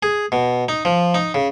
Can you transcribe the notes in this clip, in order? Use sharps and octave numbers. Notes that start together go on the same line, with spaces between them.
G#4
B2
D#4
F3
D#4
C#3